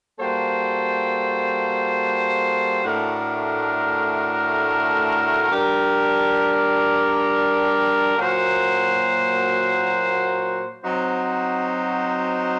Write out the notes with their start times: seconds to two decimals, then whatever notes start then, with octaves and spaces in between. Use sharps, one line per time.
0.19 G3 A#3 F#4 A4 C5
2.84 A2 A3 D4 F#4 A#4
5.51 G3 D4 G4 A#4
8.18 A#2 F#3 A#3 F#4 C5
10.83 F#3 C4 D#4 F#4 C5